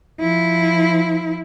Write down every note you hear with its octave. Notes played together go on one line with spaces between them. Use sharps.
F3 E4